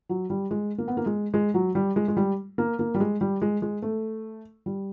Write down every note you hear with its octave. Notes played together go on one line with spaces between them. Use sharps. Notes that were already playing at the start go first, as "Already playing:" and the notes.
F#3
G3
G#3
A#3
B3
A#3
G#3
G#3
F#3
G3
G#3
G#3
G3
A#3
A#3
G3
G#3
G3
G#3
G#3
A3
G3